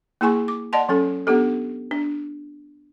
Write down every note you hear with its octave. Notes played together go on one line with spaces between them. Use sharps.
A#3 E4 G#4 G#5 C#6
D6
D5 D#5 F#5 A5 C6
F#3 C#4 A4
B3 D4 G4 A4
D4